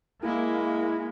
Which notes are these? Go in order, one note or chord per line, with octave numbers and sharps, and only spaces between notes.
G#3 A#3 E4